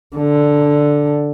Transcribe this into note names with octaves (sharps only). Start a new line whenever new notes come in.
D3